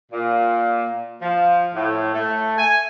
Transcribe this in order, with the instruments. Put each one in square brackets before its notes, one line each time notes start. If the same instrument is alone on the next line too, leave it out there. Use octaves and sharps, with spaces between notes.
[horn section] A#2
F3
A2
A3
G#5